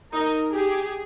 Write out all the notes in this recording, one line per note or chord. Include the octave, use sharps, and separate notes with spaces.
D#4 A#4
G4 G#4